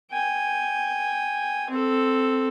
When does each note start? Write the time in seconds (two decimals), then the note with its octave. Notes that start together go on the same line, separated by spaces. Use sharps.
0.12 G5 G#5
1.70 C4 A4